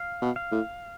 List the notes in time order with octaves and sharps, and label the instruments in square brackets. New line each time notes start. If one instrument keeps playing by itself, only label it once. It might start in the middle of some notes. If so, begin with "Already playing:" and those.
Already playing: [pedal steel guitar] F5
[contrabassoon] B2
[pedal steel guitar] F5
[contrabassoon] A2